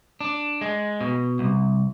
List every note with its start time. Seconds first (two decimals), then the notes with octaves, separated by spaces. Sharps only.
0.21 D4
0.61 G#3
1.01 B2
1.39 C2